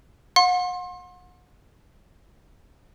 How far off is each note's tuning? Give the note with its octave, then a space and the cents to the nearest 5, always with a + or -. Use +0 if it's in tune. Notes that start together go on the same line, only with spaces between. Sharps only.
F#5 -40 C6 +30